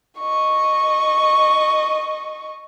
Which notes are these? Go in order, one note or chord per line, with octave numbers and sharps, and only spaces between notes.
D#5 C#6